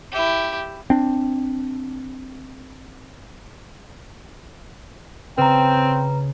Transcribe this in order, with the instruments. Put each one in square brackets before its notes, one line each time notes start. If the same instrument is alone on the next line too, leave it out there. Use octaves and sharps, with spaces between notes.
[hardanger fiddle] E4 G4
[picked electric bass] C4 D4
[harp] C#3 [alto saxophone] C4 [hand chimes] B4 A#5 [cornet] G5